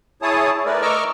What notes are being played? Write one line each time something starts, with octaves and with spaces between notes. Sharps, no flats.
E4 G#4 C#5 A5 D#6
A3 A#4 B4 D5
D#5 A#5 C#6 D6 E6 F6